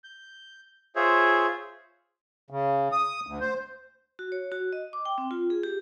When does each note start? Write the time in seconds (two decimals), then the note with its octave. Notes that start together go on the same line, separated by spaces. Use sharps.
0.04 G6
0.96 F4 G#4 C5 C#5 E5
2.50 C#3
2.92 D#6
3.27 D2
3.41 C5
4.19 F#4
4.32 C#5
4.52 F#4
4.73 D#5
4.93 D6
5.05 G5
5.18 C4
5.31 F4
5.50 G#4
5.63 G4